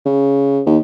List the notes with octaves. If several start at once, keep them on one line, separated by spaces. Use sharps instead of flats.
C#3
D#2